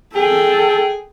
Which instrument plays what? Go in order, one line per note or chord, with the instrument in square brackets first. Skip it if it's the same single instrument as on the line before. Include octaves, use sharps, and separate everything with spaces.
[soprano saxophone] G#4 [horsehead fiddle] A4 G5